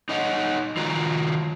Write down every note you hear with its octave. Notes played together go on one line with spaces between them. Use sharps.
D#4 C#5 D#5 F#5
D#3 F4 F#4 A#5